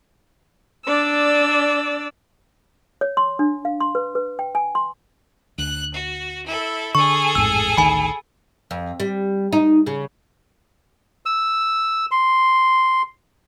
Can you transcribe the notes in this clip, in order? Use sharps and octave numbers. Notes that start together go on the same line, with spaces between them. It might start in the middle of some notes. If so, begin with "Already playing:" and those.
D4 D5 E6
C#5
C6
D4
F5
C6
B4
B4
G5
G#5
C6
D2 F#6
F#4
E4 A4
D3 G#4 A4 C#6
A1 F2 G#2 E6
A1 D2 D#3 G#5 B5
F2
G3
D#4
C#3
E6
C6